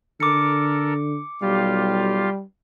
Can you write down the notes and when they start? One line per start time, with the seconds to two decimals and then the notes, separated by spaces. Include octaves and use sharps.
0.20 D3 A4 A#4 D6 C#7
1.42 B1 G3 F4 G4 F5